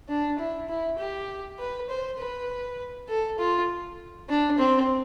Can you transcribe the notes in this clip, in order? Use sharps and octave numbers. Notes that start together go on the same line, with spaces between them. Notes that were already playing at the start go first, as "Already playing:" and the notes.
D4
E4
E4
G4
B4
C5
B4
A4
F4
D4
C4